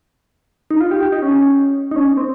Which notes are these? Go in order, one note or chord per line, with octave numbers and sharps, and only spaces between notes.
D#4
F4
G4
G4
D#4
C#4
D#4
C#4
C4